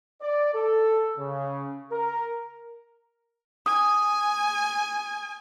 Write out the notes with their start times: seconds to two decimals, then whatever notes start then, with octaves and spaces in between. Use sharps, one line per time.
0.22 D5
0.54 A4
1.18 C#3
1.92 A#4
3.66 G#5 D#6